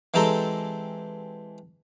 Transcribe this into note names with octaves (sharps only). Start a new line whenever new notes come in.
E3 G#3 C4 G4 A4 A#5